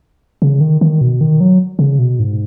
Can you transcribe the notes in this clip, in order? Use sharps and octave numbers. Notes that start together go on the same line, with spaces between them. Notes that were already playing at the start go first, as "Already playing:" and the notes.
C#3
D#3
D#3
B2
D#3
F#3
C#3
B2
G#2